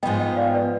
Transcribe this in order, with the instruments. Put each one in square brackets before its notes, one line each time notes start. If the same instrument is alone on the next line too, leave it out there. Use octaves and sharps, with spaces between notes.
[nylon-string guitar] B3 [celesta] D#5 G5
[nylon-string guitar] G#2 F3
[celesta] D#5 G5
D5 F5
B4 D5